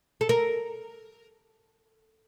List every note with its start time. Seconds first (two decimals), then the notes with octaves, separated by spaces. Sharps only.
0.21 A4
0.29 A#4